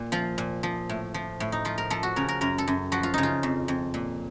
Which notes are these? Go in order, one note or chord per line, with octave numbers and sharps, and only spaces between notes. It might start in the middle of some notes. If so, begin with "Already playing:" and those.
Already playing: A#2
F3 F4
A#2
F3
A2
F3
A2
D#4
F3 F4
A#4
F3 A4
F#4
C#3 A#4
A#4
F#2 A#4
A4
F#2
F3 F#4
F4
C#3 D#4
F4
F2
F2
A#2